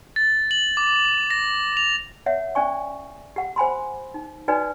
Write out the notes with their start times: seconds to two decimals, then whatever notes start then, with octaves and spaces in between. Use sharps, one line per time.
0.16 A6
0.51 F#7
0.77 D6
1.30 A#6
1.77 F7
2.26 C#5 E5 F#5
2.55 C#4 D5 G#5 C#6
3.36 G4 F#5
3.56 C5 G#5 B5 C6
4.14 D#4
4.48 D#4 F#4 B4 D5 G#5